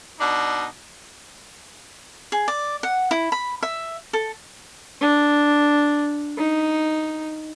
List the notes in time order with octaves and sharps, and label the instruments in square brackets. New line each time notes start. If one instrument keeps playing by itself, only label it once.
[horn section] B2 D4 D#4
[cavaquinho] G#4
D5
F#5
E4
B5
E5
A4
[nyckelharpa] D4
D#4